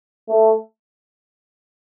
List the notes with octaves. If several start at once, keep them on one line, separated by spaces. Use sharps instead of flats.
A3